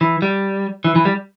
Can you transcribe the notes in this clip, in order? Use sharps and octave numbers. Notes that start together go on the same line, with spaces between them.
E3
G3
E3
E3
G3